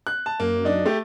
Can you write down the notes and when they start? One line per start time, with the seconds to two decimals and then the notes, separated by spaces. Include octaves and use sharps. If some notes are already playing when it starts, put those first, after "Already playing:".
0.07 F#6
0.26 A5
0.40 F#2 A#3
0.65 D4 D#4
0.86 A3 G4